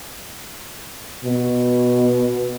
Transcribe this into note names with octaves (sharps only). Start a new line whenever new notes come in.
B2